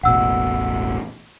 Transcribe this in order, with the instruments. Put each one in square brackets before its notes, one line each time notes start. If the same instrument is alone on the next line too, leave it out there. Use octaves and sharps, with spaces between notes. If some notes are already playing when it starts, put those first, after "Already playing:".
[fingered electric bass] E1 A1 B2 [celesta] F#5 E6